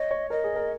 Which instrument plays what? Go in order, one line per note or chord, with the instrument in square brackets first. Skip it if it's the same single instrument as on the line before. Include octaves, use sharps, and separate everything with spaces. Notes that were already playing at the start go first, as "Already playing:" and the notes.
Already playing: [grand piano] C#5 [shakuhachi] D#5
[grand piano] C#5
[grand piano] A#4 [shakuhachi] D#5
[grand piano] G#4
A#4